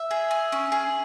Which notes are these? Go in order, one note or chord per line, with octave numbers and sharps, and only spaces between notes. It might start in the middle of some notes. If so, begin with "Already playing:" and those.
Already playing: E5
G#4
G#4
C#4
G#4